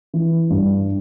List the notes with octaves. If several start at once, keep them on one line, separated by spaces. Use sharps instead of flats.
E3
G2